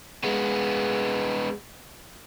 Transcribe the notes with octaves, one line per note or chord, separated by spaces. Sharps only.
G#3 B3